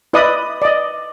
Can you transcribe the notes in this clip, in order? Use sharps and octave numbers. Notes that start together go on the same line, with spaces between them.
E4 B4 D5 D#5 D#6
D5 D#5